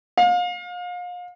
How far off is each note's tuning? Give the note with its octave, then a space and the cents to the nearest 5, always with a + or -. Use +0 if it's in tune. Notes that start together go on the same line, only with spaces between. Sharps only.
F5 +35